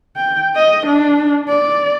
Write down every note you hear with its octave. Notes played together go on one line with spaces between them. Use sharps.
G5
D#5
D4
D5